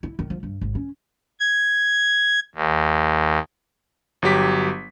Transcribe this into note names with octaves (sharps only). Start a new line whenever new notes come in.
E4
D#3
F3
G2
G#1
C#4
G#6
D#2
G1 F#3 G4 B6